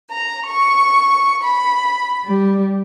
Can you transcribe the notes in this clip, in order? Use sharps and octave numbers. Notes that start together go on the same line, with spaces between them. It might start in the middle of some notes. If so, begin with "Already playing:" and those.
A#5
C#6
B5
G3